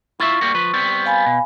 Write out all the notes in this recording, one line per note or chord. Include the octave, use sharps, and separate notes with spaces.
E4 F4 E5 C#6
G3 A#3 F#4
F3 B4
G3 B3 C4
F5 G#5 B5
B2